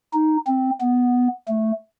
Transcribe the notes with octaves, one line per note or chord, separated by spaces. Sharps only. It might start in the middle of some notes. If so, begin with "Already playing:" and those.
D#4
C4
B3
A3